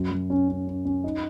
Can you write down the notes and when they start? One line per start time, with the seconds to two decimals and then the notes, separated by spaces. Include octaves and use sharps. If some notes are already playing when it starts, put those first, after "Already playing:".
Already playing: F#2 F#3
0.11 F#3
0.30 C#4
0.48 C#4
0.67 C#4
0.85 C#4
1.04 D#4